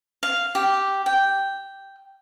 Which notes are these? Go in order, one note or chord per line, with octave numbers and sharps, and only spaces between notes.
F5
G4
G5